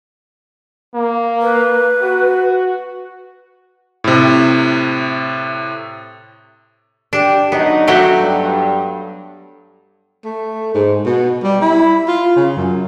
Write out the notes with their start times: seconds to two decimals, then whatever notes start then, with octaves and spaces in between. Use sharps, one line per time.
0.95 A#3
1.42 B4
2.02 F#4
4.04 A2 C3
7.13 D4 G4
7.52 D2 F#3 B3 D#4
7.87 F#3 A3 F#4 G4
8.18 G2
10.25 A3
10.74 G#2
11.06 B2
11.44 G3
11.62 E4
12.08 F4
12.36 C#3
12.57 F#2